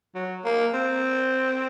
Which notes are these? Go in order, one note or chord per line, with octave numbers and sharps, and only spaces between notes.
F#3
A#3
C4